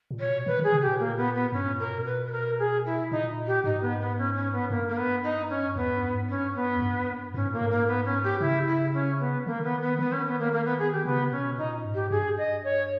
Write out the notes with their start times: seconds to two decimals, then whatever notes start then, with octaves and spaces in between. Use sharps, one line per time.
0.11 A#2
0.19 C#5
0.28 B2
0.46 D#3 B4
0.60 D#3 G#4
0.73 C#3
0.82 G4
0.87 A#2
0.99 A#3
1.17 B3
1.34 B3
1.52 G2 C#4
1.70 A#2
1.79 A#4
1.88 B2
2.05 B4
2.25 B4
2.32 A#4
2.59 G#4
2.85 E4
3.11 A#2 D#4
3.47 G4
3.64 G#2 D#4
3.81 B3
4.00 B3
4.17 C#4
4.35 C#4
4.52 B3
4.70 G2 A#3
4.88 A#3
4.97 B3
5.23 D#4
5.49 C#4
5.76 E2 B3
5.93 G2
6.11 G#2
6.29 G2 C#4
6.55 B3
6.76 E2
6.81 G2
7.34 G#2 C#4
7.48 A#2 A#3
7.60 G#2
7.70 A#3
7.87 B3
8.05 C#4
8.23 G4
8.40 C#3 E4
8.67 E4
8.93 C#4
9.19 B3
9.46 D#3 A#3
9.63 B3
9.81 B3
9.99 D#3 B3
10.12 C#4
10.26 B3
10.39 A#3
10.52 A#3
10.65 B3
10.78 G#4
10.92 G4
11.05 C#3 B3
11.31 B2 C#4
11.57 A#2 D#4
11.85 G#2
11.94 G4
12.10 G2 G#4
12.37 D#5
12.63 C#5